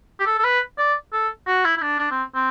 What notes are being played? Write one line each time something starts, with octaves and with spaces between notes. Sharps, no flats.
G4
A4
A4
B4
D5
A4
F#4
E4
E4
D4
D4
C4
C4